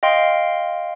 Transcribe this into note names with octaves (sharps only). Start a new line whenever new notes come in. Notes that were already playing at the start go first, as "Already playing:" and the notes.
D#5 F5 G5 C6